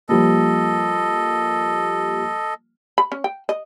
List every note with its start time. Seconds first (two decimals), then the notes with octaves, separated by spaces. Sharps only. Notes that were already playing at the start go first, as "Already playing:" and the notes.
0.09 F3 G3 A#3 A4 D#5
2.98 B5
3.12 C#4
3.24 G5
3.49 D#5